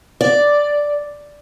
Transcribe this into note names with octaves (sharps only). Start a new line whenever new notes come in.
D5